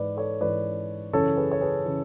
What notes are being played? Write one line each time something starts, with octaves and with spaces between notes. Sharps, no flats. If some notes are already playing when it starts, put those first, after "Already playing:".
Already playing: G#2 E3 B4 D5
A4 C#5
G#2 E3 B4 D5
F#2 C#3 E3 A4 C#5
G#4 B4
C#5
G#4 B4
C#3 E3